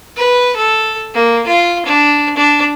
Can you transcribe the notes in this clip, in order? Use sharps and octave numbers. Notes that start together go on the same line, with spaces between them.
B4
A4
A#3
F4
D4
D4